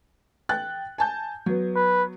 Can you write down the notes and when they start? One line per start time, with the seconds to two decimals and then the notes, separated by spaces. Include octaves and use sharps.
0.49 G5 F#6 A6
0.98 G#5 A5 G6
1.46 F#3 B3
1.76 B4